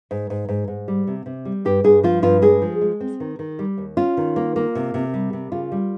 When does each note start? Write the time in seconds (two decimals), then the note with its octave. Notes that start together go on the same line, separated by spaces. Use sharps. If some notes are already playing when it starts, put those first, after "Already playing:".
0.11 G#2
0.30 G#2
0.49 G#2
0.68 G#2
0.88 G3
1.07 C3
1.26 C3
1.45 G3
1.65 G2 G4
1.84 G2 G#4
2.03 F3 F4
2.22 G2 F4
2.42 G#3 G#4
2.62 F3
2.81 G#3
3.01 C4
3.20 D#3
3.39 D#3
3.59 G3
3.78 D#2
3.97 C#4 F4
4.17 D#3
4.36 A#3
4.56 A#3
4.75 C3
4.94 C3
5.14 G3
5.33 C3
5.52 C#3 F4
5.72 G3